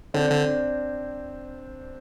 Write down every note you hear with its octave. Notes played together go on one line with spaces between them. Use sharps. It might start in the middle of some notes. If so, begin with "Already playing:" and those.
D3 C4 D4
D3